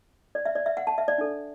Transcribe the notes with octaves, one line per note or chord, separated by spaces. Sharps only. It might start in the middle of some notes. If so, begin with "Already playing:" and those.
D5
E5
D5
E5
F#5
A5
E5
D5
D4 A4